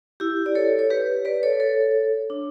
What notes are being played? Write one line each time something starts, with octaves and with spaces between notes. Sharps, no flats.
E4 G4
D5
A4 C#5
C#5
G4 B4
B4 D5
A4 C#5
A4 C#5
D4